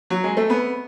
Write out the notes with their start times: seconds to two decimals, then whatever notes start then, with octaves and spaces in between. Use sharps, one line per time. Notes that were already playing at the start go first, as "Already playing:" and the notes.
0.10 F#3
0.24 G#3
0.37 A3
0.50 B3